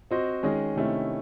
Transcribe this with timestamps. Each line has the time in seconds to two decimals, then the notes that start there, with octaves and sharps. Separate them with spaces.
0.11 C4 F#4 C5 D#5
0.43 D#3 G#3 C#4 G#4 D#5
0.76 C3 D#3 A3 C#4 E4